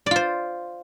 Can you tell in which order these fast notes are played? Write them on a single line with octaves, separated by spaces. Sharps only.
D5 F4 C5